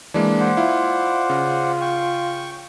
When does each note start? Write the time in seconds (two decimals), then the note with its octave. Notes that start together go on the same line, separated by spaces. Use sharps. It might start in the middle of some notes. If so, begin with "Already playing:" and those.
0.14 E3 G#3 A#3 D4
0.40 C5 D5 F#5
0.57 E4 F4
1.30 C#3
1.81 G5 C#6